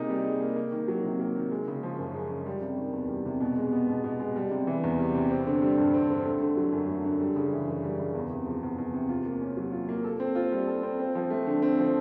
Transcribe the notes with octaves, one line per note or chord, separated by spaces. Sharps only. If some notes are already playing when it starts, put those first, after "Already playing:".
Already playing: C3 A#3 D#4 G#4
G3
G#4
A#3
A#3
D#3
F#3
C3
A#3
D#3
G#3
C#3
F3
F#2
G#3
C#3
G3
C3
D#3
E2
G3
C3
B2
G#3
B3
B2
B2
G#3
G3
C3
E3
E2
G3
C3
C4
D3
G3
G2
C4
D3
A3
D3
F#3
F#2
A3
D3
G3
C#3
E3
F#2
G3
C#3
E2
C3
F3
E2
E2
C3
F4
A#3
C#4
F#3
F4
A#3
A4
C4
F4
G3
A4
C4
C4
F3
A3
D3
C4
F3